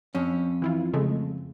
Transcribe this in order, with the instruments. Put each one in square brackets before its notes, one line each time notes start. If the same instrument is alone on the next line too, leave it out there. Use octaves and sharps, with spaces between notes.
[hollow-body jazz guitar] F2 C#4
[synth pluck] E3 E4 F4
C#3 G#3 A3